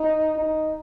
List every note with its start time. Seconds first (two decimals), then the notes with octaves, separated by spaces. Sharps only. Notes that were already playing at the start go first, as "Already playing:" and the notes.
Already playing: D#4
0.38 D#4